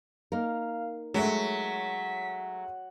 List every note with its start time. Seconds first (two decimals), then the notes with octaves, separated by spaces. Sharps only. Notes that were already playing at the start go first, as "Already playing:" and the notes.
0.32 A#3 D#4 A#4 F5
1.14 F#3 G#3 A3 B6